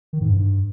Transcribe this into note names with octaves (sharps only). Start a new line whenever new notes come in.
D#3
G#2
G2